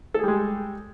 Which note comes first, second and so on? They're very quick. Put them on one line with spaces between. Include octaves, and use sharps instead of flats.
A4 G#4 G3 G#3